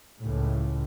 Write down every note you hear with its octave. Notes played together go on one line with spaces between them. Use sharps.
C#2 A2